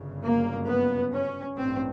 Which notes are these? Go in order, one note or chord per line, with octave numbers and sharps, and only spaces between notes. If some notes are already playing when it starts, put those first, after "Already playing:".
Already playing: G1 F#2 C#3
A#3
B3
C#4
A1 G2 C4